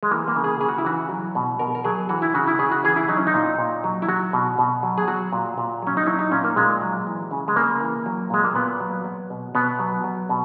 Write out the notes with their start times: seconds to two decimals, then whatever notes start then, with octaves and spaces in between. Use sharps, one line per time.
0.03 G#3
0.11 E3 A#3
0.28 A#3
0.36 C#3
0.44 G#4
0.61 C#3 G#4
0.69 F#4
0.78 E4
0.85 E3 F#4
1.10 F#3
1.35 B2
1.59 B2 A#4
1.75 A#4
1.84 F#3 G#4
2.09 E3 F#4
2.22 E4
2.34 C#3 F#4
2.47 E4
2.59 C#3 G#4
2.72 F#4
2.83 E3 G#4
2.96 E4
3.08 F#3 D#4
3.17 C#4
3.27 D#4
3.34 A#2
3.58 A#2
3.84 F#3
4.02 E4
4.08 F#3 F#4
4.33 B2
4.59 B2
4.83 F#3
4.98 G#4
5.08 F#3 F#4
5.33 A#2
5.58 A#2
5.83 F#3 C#4
5.97 D#4
6.07 F#3 E4
6.19 D#4
6.31 A#2 C#4
6.44 A#3
6.56 A#2 G#3
6.81 F#3
7.07 E3
7.31 C#3
7.48 G#3
7.56 C#3 A#3
7.81 E3
8.06 F#3
8.30 A#2 G#3
8.44 A#3
8.55 A#2 B3
8.80 F#3
9.04 F#3
9.30 B2
9.55 B2 B3
9.79 F#3
10.04 F#3
10.29 B2